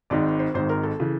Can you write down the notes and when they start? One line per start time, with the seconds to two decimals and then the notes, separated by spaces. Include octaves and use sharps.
0.10 G#1 G#2 D#3 D5
0.39 C5
0.54 G#1 G#2 D#3 C5
0.69 A#4
0.83 A4
1.00 C#3 E3